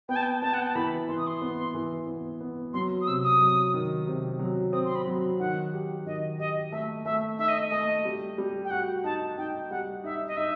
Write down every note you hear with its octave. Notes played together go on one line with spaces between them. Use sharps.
B3 G5
A5
G5
B3 A5
F#5
G5
A5
E3 B5
E3 C6
D#6
C6
B3
E3
B3
B3
F#3 C6
D#6
C3 E6
D#6
F#3
D#3
C3
F#3
C4 D#6
C6
B5
F#3
D#3 F#5
G4
D#3 D#5
G4 D#5
A3 E5
A3 E5
D#4 E5
D#5
A3 D#5
G3
G3
G5
F#4 F#5
D#4 A5
D#4 G5
G3 F#5
D#4 E5
D#5
D#4 E5